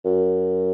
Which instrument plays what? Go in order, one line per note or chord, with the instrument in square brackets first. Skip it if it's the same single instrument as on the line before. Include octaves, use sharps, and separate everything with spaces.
[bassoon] F#2